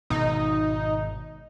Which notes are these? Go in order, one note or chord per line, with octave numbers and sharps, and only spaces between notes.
G#1 B2 D#4